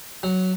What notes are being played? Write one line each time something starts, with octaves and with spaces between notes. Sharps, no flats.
F#3